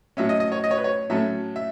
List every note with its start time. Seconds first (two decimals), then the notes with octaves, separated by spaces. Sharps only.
0.17 A2 F#3 C#4 E5
0.29 D#5
0.40 D#5
0.52 C#5
0.64 D#5
0.71 C#5
0.77 B4
0.84 C#5
1.10 A2 F#3 A3 C#4 E5
1.56 E5